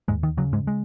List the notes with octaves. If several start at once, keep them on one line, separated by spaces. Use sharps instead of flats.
D#2 G#2 G#3
D#3
C#3 F#3
G#2 G#3
G#3